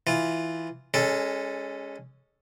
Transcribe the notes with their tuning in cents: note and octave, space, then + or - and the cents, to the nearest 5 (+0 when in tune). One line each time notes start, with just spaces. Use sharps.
E3 +0 F4 +0
G#3 -20 C#4 +0 A4 +0